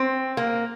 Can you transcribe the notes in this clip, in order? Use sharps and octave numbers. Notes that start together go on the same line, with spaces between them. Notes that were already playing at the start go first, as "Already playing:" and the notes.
Already playing: C4
A#3